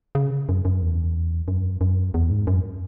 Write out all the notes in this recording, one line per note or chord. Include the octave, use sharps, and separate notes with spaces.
C#3
F#2
F#2
E2
F#2
F#2
E2
G#2
F#2